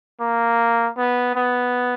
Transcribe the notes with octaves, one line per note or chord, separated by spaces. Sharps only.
A#3
B3
B3